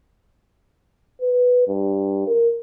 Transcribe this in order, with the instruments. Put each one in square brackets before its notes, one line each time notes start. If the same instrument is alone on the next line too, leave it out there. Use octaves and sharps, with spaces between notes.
[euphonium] B4
G2
A#4